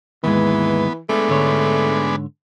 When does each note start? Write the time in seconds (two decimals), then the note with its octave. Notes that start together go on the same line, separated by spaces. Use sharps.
0.24 D#2 G#2 E3 G#3 B3
1.09 G#3 A3 B3 D4
1.28 G#2 D3 C#5